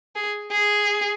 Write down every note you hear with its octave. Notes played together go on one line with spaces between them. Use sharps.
G#4
G#4